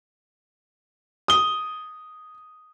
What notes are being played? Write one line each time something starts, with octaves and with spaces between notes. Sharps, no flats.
D#6 G7